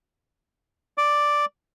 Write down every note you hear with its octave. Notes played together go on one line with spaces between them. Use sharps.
D5 D6